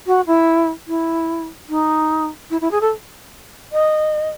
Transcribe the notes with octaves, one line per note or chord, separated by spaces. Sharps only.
F#4
E4
E4
D#4
E4
E4
G#4
A4
D#5